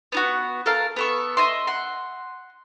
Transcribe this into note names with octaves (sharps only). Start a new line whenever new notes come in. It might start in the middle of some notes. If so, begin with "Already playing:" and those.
B3 D#4 F#4
A4 A#4 F5
B3 A4 C#6
D#5 E5 C6
F#5 C6